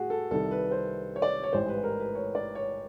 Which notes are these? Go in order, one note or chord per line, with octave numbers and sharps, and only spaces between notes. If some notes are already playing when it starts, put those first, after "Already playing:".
Already playing: A2 F#4 G#4
A4
C2 C3 D#3 A4
B4
C5
C#5
D5
C#5
A1 G#2 E3 G3 C5
B4
A#4
B4
C#5
D5
C#5